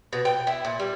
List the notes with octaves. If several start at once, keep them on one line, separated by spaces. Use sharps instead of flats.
B2
G5
E4
A#2
G3